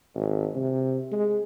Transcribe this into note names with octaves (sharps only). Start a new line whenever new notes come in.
G#1
C3
G#3